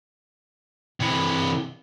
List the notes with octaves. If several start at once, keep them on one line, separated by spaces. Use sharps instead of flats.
C3 E3